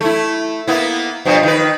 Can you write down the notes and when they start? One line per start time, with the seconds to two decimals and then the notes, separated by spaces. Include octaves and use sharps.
0.01 A3 E4
0.67 A#3 B3 E4
1.25 G2 B2 F3
1.43 D#3 B4